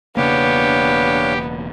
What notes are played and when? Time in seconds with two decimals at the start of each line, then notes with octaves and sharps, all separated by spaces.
0.17 E1 C#3 A#3 B3 D4 G4 C#5 F5